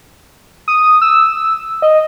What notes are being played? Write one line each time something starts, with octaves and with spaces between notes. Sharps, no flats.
D#6
E6
D#5